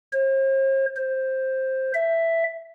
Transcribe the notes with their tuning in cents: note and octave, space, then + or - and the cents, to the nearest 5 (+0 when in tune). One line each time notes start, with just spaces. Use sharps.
C5 +45
C5 +10
E5 +5